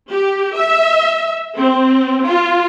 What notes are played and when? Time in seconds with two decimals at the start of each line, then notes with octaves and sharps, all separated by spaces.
0.11 G4
0.56 E5
1.57 C4
2.26 F4